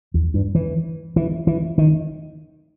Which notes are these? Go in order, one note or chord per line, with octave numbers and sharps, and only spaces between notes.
E2
G2
E3
E3
E3
D#3